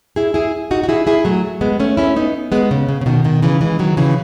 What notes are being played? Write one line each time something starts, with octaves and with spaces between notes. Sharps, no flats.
E4 G#4
E4 G#4
D#4 F#4
F#4
E4 G#4
E4 G#4
F#3 A3
G#3 B3
A3 C#4
C#4 E4
B3 D#4
G#3 B3
C#3
C#3
C#3
B2 D#3
B2 D#3
C#3 E3
E3 G#3
D#3 F#3
C#3 E3